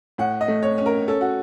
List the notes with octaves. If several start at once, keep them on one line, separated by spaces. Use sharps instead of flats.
A2 F#5
D#5
A3
C#5
C#4
A#4
C#4 A4
F#4